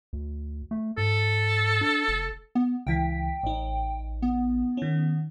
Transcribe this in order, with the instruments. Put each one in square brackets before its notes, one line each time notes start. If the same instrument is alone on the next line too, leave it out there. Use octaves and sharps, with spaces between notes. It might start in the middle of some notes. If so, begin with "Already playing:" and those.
[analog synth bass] D2
A3
[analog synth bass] G#2 [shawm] A4
[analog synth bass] D4
F1
[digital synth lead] B3
[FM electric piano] C#2 E3 B6 [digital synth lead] G5
[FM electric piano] A1 D#4
[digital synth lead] B3
[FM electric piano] D#3 C#4